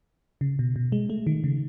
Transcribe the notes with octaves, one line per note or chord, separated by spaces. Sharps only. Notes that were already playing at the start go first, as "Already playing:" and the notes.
C#3
B2
B2
G#3
A3
D#3
C#3